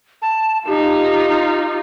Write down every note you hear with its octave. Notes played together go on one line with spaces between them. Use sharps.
A5
D#4 F4 G4